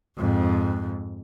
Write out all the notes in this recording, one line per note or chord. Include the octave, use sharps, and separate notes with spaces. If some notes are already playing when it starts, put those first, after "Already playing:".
F2 G#2